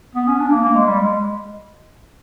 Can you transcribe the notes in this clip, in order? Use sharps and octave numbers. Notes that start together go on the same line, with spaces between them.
B3
C#4
D4
A#3
A#3
G#3
G3
G#3